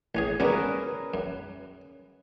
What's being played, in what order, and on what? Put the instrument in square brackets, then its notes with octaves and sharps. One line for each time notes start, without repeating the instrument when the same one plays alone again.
[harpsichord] A1 C#4 G#4
[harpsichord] G2 B3 D4 [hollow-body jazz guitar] C#4 C#5 [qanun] G#4 A#4 B4
[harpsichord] F#2